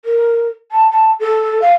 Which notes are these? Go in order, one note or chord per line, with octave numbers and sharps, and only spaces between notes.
A#4
A5
A5
A4
F5